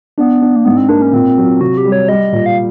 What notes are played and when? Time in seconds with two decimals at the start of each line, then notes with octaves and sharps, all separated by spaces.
0.18 B3 D4
0.41 D4
0.56 A#3
0.65 G#2 B3
0.77 C4
0.89 A#3 D4
1.02 C#4
1.13 A#2 C4
1.37 F#3
1.61 C3 F#4
1.77 G4
1.85 G3
1.92 C#5
2.09 G3 D#5
2.32 A#2
2.46 F5